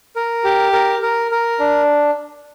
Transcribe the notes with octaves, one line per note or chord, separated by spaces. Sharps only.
A#4
G4
A#4
A#4
A#4
D4